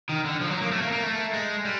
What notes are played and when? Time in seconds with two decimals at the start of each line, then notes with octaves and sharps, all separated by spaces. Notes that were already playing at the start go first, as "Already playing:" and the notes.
0.09 D#3
0.25 D3
0.41 F3
0.51 F#3
0.61 A#3
0.72 A3
0.82 A#3
0.92 A#3
1.03 A3
1.33 G#3
1.65 G3